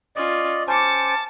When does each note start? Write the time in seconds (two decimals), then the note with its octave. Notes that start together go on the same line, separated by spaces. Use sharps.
0.16 C#4 F4 D5 D#5
0.67 C#4 C5 A5 D6 C#7